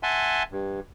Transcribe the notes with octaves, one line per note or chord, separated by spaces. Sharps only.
E5 F#5 G#5 A5 C6
G2